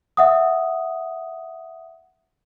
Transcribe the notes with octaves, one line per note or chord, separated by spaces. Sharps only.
E5 F#5 D#6